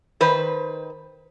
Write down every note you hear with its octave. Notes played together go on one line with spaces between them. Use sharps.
D#3 B4 C5